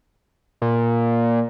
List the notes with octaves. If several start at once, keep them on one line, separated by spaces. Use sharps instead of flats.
A#2